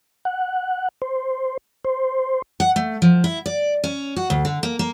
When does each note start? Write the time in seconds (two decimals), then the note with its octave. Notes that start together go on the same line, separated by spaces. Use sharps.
0.25 F#5
1.02 C5
1.85 C5
2.60 F#5
2.76 A3
3.02 F3
3.24 E4
3.46 D5
3.84 C#4
4.16 F#4
4.30 D2
4.45 D3
4.63 A#3
4.79 A#3